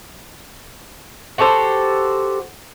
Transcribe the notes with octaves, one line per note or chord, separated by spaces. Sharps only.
F#4 G4 A4 C5